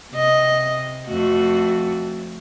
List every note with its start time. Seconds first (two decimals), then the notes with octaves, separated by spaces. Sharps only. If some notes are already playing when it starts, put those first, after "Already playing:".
0.11 C3 D#5
1.07 F2 A3 F#4